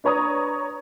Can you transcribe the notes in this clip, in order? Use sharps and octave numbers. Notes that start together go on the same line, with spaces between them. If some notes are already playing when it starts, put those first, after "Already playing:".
D4 B4 C#5 A#5 D#6